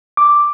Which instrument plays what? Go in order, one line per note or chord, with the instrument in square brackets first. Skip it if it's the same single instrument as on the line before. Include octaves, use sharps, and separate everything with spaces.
[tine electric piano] D6